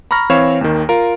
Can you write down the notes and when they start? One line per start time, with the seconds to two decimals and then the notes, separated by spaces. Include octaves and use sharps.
0.11 A#5 B5 C#6 F6 A#6
0.29 E3 C4 C#5 F5 B5 E7
0.61 D#2 D#3
0.89 F4 A#4